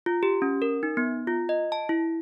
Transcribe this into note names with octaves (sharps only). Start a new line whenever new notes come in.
F4
G4
C#4
A#4
D#4
B3
F4
D#5
A5
E4